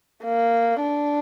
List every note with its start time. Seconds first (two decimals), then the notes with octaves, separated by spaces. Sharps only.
0.24 A#3
0.81 D4